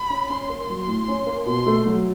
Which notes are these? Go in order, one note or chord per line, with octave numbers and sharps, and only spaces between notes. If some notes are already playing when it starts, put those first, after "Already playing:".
Already playing: B5
C#4
C#4 C6
A#3
F#3
A2
C#4
A#3
B2 C6
A3
F#3